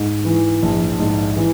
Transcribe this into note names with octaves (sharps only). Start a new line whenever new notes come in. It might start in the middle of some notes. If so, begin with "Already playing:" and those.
Already playing: G#2
E3
A#1
G#2
E3